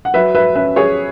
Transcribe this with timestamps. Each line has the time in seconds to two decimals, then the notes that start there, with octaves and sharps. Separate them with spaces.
0.05 F#5
0.14 F#3 B4 E5
0.35 B4 E5
0.55 C#4 B4 E5
0.76 G#4 C#5